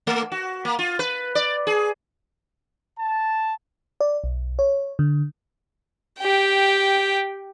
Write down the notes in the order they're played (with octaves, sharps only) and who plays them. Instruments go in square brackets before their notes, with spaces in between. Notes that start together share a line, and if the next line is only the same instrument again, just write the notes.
[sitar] A3
F#4
A#3
F4
B4
D5
G#4
[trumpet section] A5
[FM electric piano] D5
B1
C#5
D3
[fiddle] G4 G5